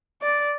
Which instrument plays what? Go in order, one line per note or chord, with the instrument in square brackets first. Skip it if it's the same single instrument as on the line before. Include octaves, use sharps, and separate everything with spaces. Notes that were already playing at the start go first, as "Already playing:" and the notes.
[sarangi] D5